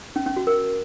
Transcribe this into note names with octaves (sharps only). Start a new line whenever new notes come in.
C#4
C#4
F#4
A#4